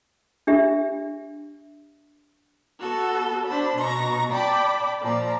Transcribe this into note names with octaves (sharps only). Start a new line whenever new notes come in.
D4 G4 E5
B3 F#4 A4
D4 C5 A5 B5
B2 A#5 C#6 A#6
D5 G5 A5 B5 D6
A#2 F3 D5 A#5